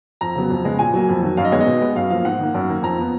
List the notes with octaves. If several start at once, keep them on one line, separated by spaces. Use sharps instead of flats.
F2 A#5
C#3 F#3 B3
F2
C#3 G#3 B3
A#2 G#5
F#3 A#3
F2
D#3 F#3 A#3
F#2 F5
D#5
D#3 G#3 B3 C#5
D#5
B2
G#3 B3
F#2 F5
F3 A#3 F5
G#2 F#5
D#3 A#3
F#2
D#3 A#3
F2 A#5
F3 B3